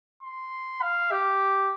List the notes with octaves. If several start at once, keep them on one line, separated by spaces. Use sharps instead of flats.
C6
F5
G4